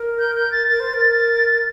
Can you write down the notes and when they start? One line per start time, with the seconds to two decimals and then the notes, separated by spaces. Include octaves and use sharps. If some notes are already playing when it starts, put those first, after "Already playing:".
Already playing: A#4
0.19 G6
0.35 G6
0.52 A6
0.68 A#4 A6
0.80 C5
0.94 A#4